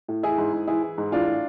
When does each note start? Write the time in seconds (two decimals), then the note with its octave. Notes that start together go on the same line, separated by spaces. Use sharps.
0.08 A2
0.23 E3 E4 G#4
0.38 G#2
0.53 G#2
0.67 E3 E4 G#4
0.83 E3
0.98 G#2
1.12 E3 D4 F4
1.28 A2